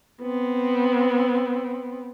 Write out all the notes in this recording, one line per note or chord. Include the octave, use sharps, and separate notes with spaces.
B3 C4